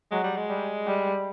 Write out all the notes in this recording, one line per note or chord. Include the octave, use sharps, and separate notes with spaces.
F#3 G#3
G3
G#3
G3
G3